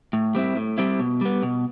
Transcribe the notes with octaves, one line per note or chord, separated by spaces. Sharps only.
A2
G3 C4 E4
A2
G3 C4 E4
B2
G3 B3
B2